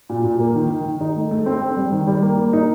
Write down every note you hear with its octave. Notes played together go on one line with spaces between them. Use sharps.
A#2
A#2
A#3
D#3
D#3
D#3
D#4
A3
A3
C4
C4
G3
D#3
G3
A#3
A#3
D#4